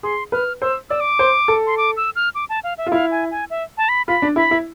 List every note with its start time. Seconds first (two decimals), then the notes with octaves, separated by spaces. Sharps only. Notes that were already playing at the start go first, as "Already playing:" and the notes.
0.03 G#4 C6
0.32 B4 F6
0.62 C5 E6
0.90 D5 E6
1.00 D6
1.19 C5
1.48 A4
1.67 C6
1.77 D6
1.97 E6
2.16 F6
2.35 D6
2.49 A5
2.64 F5
2.78 E5
2.86 F4
2.92 E4 F5
3.11 G#5
3.31 G#5
3.50 E5
3.78 A5
3.89 B5
4.08 F4 B5
4.22 D4
4.36 E4 B5
4.51 E4